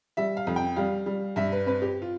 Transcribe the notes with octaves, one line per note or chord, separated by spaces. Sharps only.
G3 E5
F5
F2
G5
G3 F5
G3
G2 E5
B4
C4 B4
G4
F4